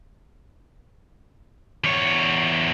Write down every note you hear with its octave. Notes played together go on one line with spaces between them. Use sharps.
E2 C#5